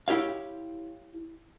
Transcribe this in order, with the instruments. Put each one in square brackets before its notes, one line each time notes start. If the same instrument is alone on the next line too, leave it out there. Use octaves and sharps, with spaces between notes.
[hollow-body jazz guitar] E4 G4 C#5 F5